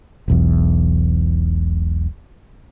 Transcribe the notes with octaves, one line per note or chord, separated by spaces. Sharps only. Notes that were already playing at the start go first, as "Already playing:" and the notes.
E1 B1 E2